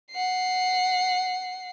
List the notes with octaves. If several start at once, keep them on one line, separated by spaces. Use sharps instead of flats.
F#5 C7